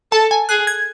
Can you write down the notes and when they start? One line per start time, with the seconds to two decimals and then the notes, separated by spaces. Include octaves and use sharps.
0.12 A4 A5
0.31 G#5
0.49 G#4 F#6
0.67 G#6